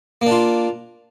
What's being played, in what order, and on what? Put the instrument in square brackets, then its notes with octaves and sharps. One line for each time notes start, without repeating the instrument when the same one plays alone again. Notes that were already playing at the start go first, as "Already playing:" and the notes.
[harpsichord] A#3
D4
F4